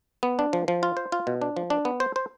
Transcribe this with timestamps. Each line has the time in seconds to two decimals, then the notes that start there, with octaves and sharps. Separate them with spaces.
0.23 B3
0.39 D4
0.53 F3
0.68 F3
0.83 F4
0.97 C5
1.12 F4
1.27 B2
1.42 D4
1.57 F3
1.70 D4
1.85 B3
2.00 C5
2.16 C5